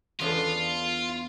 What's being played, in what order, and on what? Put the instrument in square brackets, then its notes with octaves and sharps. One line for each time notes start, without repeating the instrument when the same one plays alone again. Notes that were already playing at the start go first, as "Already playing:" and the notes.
[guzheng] E2 B3 D4 [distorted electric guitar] F4